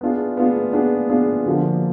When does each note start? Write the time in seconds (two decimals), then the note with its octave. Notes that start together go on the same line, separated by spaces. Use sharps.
0.01 B3 D4 F4 G#4
0.37 B3 D4 F4 G#4
0.73 B3 D4 F4 G#4
1.09 B3 D4 F4 G#4
1.46 D3 F3 A#3